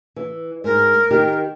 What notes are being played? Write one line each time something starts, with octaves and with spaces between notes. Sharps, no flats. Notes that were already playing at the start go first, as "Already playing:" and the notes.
E3
G#2 A#4
D#3 G4